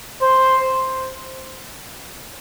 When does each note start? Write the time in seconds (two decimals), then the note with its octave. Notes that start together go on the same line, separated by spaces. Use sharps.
0.22 C5